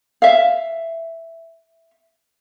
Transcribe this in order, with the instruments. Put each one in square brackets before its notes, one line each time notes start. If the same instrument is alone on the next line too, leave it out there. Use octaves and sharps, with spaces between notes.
[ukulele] E5 F5